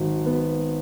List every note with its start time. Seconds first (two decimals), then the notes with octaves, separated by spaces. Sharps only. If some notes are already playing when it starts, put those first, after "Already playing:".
Already playing: G#1 F#3
0.26 B3